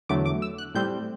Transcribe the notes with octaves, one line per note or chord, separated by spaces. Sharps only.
E2 D3 F#3 A3 D6
D6
E6
F#6
A2 G3 C4 G6